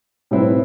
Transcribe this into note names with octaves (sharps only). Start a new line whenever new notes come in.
A2 G3 C4 E4 B4